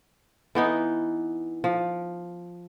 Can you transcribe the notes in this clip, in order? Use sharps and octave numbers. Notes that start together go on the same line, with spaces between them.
E3 B3 D#4
F3